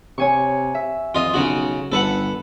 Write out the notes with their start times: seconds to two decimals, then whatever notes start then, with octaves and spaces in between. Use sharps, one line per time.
0.18 C3 C#5 G#5 C#6
0.75 E5
1.15 F2 F4 D#5
1.34 B1 C#3 F#4
1.92 G1 A4 B4 F#5